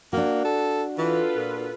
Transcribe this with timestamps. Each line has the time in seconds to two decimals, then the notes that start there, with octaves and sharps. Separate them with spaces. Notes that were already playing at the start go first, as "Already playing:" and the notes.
0.13 A#3 D4 F#4
0.45 A4
0.98 E3 F4 A4 B4
1.36 A#2